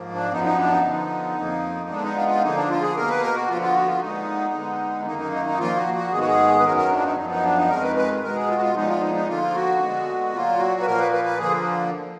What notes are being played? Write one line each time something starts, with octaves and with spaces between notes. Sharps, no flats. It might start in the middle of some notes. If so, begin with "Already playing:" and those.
Already playing: G#2 F3 A#3
D4
F#2 F3 B3 D#4
D#4
D4
D#4
D3 F3 B3
F2 F3 A#3
D3 G#3 B3 D4
D#4
F4
D#4
F4
D3 F3 A#3 D#4
D4
F4
G#4
B2 A#3 A#4
B4
A#4
F#4
D3 F3 B3 F4
F4
F#4
F4
A#2 G#3 B3 D#4
D3 G#3 B3
F#2 D#3 A#3 D#4
D#4
D#4
D#4
A#2 F3 A#3 F4
F#4
F#4
G#2 D#3 G#3 B3 G#4
F#4
G#4
B4
F#2 D#3 F#3 B3 A#4
A#4
D4
F4
D#4
F#2 F3 B3 D#4
D#4
D4
D#4
F2 D#3 G#3 A#4
B4
B4
B2 G#3 B3 A#4
G#4
F4
F#4
F4
A#2 F3 G#3 B3 D#4
F4
D#4
D#4
D3 F3 A#3 F4
F#4
D3 G#3 B3
A#2 F#3 A#3 F4
F#4
B4
A#2 F3 A#3 A#4
B4
B4
B4
D3 F3 A#3 G#4